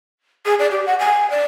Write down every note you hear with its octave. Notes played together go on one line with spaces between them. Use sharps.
G#4
D5
G4
F#5
G#5
D5